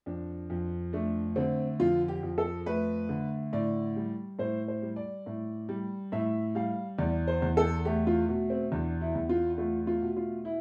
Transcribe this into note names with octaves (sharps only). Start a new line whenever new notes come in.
F2 D4
F2
A3 D4
D3 C4
F2 F4
G4
F2
A4
A3 B4
D3
A2 D5
G3
A2 C5
C5
G3
D5
A2
G3
A2 E5
G3 F5
E2 D5
C5
E2
A4
A3 G4
F4
B2
C4
E2 D4
E4
E2
F4
A3 F4
F4
B2
F4
E4